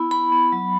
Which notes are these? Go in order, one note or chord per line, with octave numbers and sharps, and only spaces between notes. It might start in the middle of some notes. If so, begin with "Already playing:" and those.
Already playing: B3 E4 B5
E4 B5
B3
F#3